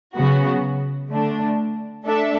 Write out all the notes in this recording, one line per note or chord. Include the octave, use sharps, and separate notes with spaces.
C#3 F#3 B3 F#4
D3 A3 D4
A3 D4 A4 E5